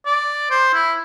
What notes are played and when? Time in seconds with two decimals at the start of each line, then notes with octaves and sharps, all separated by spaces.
0.06 D5
0.50 C5
0.73 E4